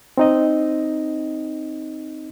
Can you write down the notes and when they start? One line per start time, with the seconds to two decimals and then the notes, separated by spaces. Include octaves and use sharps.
0.18 C4 D#4 D#5